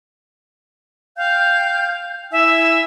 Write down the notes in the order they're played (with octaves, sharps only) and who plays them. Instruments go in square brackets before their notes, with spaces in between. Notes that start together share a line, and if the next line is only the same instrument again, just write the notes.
[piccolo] F5 [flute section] G5 G6
[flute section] E4 G#5 E6 [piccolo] E5